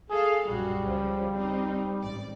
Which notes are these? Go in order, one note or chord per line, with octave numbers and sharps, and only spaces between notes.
G#4 A4 F5
A#1 F#2 G3 F#4
C#2 C#3 F3
C4 D#4
A1 G#2 D5